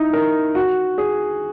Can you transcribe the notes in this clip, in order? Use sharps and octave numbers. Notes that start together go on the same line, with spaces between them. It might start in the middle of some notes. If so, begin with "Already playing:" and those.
Already playing: D#4 E4
A#4
F#4
G#4